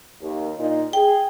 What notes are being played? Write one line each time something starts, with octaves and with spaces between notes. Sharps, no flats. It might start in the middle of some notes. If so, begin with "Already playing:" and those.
D#2
A#2 D#4
G#4 G5